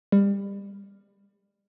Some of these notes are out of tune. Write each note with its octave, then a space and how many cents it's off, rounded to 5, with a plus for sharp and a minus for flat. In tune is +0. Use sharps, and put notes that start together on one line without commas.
G3 +30